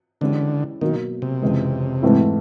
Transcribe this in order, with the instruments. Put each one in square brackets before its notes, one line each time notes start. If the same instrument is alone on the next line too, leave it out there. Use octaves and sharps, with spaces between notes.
[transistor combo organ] D3 [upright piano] E3 G#3 C#4 E4 G4
[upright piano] B2 F#3 A#3 [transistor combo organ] D#3
[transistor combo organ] C3
[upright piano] F2 C#3 E3 G#3
G#2 E3 A3 C4 E4